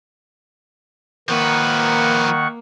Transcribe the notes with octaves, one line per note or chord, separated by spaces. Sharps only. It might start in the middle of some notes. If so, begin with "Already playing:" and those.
D#3 F3 A#3 B4 F#5 C#6